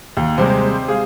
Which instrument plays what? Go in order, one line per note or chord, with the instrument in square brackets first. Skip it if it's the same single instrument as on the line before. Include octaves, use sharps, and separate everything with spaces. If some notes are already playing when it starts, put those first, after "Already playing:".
[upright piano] D#2
[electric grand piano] C3 G3 G#3 [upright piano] C5
[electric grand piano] G#4 F5